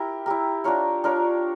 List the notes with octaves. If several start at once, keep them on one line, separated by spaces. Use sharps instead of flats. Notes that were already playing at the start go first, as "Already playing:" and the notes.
Already playing: E4 G4 A#4
E4 G4 A#4
D4 F4 A#4 C#5
D4 F4 A#4 C#5